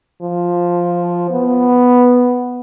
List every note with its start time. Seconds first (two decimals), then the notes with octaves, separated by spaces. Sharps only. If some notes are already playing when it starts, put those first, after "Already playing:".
0.22 F3
1.30 B3